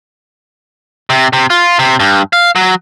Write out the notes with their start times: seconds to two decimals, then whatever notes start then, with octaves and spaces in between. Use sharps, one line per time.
1.10 C3
1.33 C3
1.50 F4
1.79 C3
2.00 G2
2.33 F5
2.56 F#3